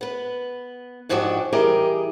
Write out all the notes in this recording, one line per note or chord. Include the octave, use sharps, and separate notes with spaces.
B3 B4
F2 G#2 F3 D4 F#4 G4
E3 G3 G4 G#4 A#4 D#5